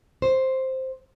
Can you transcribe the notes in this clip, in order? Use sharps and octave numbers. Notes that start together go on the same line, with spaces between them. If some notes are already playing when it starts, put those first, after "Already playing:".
C5